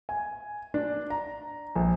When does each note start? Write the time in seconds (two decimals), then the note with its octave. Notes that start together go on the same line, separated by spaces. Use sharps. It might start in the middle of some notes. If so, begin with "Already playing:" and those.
0.09 G#5
0.74 D4
1.10 A#5
1.76 A#1